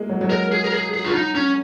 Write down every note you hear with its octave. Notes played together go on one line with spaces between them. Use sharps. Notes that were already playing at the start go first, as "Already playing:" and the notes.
Already playing: G#3 A#3
F#3
F#3
G#3 A#4
G#4
A#4
G#4
G#4
F4
D#4
C#4